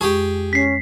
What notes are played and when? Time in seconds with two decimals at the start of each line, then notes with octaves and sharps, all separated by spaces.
0.01 F2 G#3 G4 G#4 C#6
0.53 C#4 B6 C7